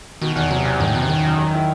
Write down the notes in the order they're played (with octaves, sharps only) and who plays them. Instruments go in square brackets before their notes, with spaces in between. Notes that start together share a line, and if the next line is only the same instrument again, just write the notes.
[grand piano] B2 [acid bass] D#3
[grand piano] E2 [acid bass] D#3
[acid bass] C3 [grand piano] F#3
[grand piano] E2
[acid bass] G2 [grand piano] D#3
[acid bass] A2
[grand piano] F#2 [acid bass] B2
[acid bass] C3
[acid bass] D#3 [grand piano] F#3
[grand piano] F#2
F#3
E4